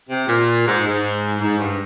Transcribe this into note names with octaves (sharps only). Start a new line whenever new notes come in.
C3
A#2
G#2
G#2
G#2
G2